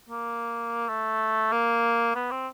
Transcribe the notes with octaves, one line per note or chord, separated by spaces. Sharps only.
A#3
A3
A#3
B3
C4